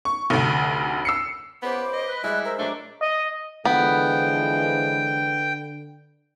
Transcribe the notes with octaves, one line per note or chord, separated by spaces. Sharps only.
C#6
F1 D2
E6 C7 C#7
C#2 B3 C5 B5 D6
D#5
B4
G3 G#3 E4 F#6
A#4 C5 E5
A3 D4 A#4 C#5 C6
D#5
D3 E3 F3 G#3 B3 G5